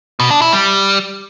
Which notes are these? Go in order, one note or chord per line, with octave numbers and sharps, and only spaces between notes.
B2
D4
E4
G3